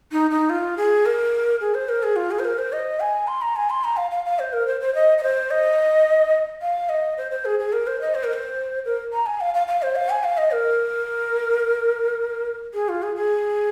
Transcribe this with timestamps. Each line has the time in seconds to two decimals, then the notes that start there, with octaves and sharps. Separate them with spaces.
0.12 D#4
0.31 D#4
0.50 F4
0.77 G#4
1.06 A#4
1.61 G#4
1.74 C5
1.89 A#4
2.03 G#4
2.16 F4
2.31 G#4
2.39 C5
2.45 A#4
2.58 C5
2.73 D#5
3.00 G#5
3.27 C6
3.42 A#5
3.56 G#5
3.70 C6
3.84 A#5
3.97 F5
4.11 F5
4.25 F5
4.39 C5
4.53 A#4
4.67 C5
4.81 C5
4.95 D#5
5.18 D#5
5.23 C5
5.51 D#5
6.62 F5
6.89 D#5
7.18 C5
7.31 C5
7.45 G#4
7.59 G#4
7.73 A#4
7.87 C5
8.01 D#5
8.15 C5
8.24 A#4
8.33 C5
8.85 A#4
9.13 A#5
9.26 G#5
9.41 F5
9.54 F5
9.68 F5
9.82 C5
9.96 F5
10.10 G#5
10.24 F5
10.38 D#5
10.51 A#4
12.74 G#4
12.89 F4
13.03 G#4
13.16 G#4